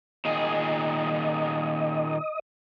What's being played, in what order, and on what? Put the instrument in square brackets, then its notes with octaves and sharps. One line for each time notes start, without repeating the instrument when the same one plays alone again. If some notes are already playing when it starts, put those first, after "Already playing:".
[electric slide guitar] A#2 D#3 G#4 [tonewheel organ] D#5